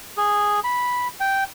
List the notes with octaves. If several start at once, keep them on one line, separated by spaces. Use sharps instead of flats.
G#4
B5
G5